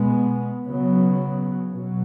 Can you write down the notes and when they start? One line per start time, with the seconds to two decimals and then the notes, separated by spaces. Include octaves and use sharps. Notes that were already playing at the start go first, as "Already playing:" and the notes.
Already playing: B2 G#3 B3
0.65 C#3 F#3 B3
1.73 B2 F#3